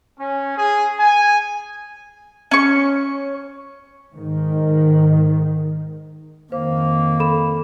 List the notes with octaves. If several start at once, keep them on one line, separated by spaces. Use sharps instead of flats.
C#4
G#4
G#5
C#4 C#6
G#2 D#3
F2 D#3 A#3 C5
A4 B5 E7